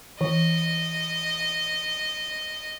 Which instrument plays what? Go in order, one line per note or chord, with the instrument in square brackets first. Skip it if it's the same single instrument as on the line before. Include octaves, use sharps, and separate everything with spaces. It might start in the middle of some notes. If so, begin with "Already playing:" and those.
[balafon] E3 [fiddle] D#5